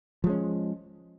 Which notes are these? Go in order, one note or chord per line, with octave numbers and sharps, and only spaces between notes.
F3 G#3 C#4